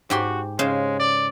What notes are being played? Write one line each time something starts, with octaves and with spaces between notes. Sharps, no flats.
G#2 F#4 G4 C6
C#3 G#3 C5 F5
D5